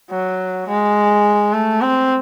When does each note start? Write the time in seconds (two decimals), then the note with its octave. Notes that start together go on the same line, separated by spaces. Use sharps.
0.11 F#3
0.68 G#3
1.53 A3
1.82 C4